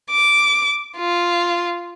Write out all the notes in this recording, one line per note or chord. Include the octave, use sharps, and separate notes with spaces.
D6
F4